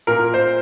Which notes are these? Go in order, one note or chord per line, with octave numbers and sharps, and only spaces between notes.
A#2 A#4
C5